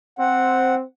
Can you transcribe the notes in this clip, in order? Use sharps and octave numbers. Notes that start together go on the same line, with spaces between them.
C4 F#5